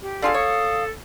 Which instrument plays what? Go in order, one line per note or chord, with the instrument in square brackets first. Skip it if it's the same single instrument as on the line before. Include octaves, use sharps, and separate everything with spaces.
[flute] G4
[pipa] D4 F4 G#4 [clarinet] A4 [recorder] F5
[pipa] C#5 [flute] D#6